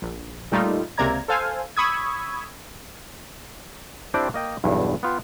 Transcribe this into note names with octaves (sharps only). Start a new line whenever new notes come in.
A#1
A#2 G3 A3 D#4 F4
C#2 C3 A#3 D5 A#5 G#6
A4 C5 F5 G#5
B5 C#6 D#6 E6 G#6
C4 D4 E4 G4 C5 D5
A#3 D#5 G5
B1 E2 G2
B3 F4 G5